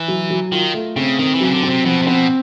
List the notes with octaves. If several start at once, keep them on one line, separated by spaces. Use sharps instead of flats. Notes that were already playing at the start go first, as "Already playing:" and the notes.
Already playing: E3
F#3
F#3
D#3 F4
A3
C#3 C4
D#3 C4
E3
C#3 F#3
D3
C4
C3
B2 F3
C3
B2 C4